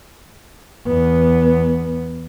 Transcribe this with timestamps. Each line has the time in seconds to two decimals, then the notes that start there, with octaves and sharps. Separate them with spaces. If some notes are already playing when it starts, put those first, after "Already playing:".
0.88 E2 B3